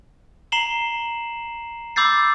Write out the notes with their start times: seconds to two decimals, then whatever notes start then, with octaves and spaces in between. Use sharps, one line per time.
0.52 A#5 C7 E7 F#7 G7
1.96 B5 D6 E6 G6 A6 C7